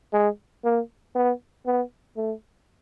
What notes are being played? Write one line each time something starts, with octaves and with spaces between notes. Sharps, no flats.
G#3
A#3
B3
B3
A3